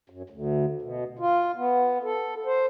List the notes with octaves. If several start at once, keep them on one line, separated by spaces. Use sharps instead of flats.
F#2
D2
B2
F4
B3
A4
C5